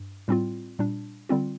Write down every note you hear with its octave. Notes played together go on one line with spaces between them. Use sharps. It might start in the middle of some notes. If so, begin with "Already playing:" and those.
Already playing: G2
A2 G3 C4 F4
A#2 G3 D4
D3 G3 C4 F4